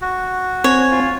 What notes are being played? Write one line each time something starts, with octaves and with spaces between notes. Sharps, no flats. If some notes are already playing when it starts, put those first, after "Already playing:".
F#4
C4 C#5 G#5
F4